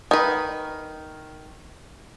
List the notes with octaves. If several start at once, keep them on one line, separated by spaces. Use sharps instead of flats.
D#3 B4